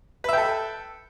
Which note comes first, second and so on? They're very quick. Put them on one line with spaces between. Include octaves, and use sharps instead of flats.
B4 E5 G5 A4